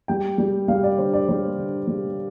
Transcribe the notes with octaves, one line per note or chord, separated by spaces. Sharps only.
G3 G5
G3
G3 F5
D5
D3 C5
D5
G3 C5
D3
G3